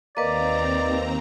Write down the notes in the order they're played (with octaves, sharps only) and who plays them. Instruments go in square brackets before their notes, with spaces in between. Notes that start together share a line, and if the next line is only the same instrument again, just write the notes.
[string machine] D#2 C4 A#5 [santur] A#3 [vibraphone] B4 D#5 [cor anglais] D5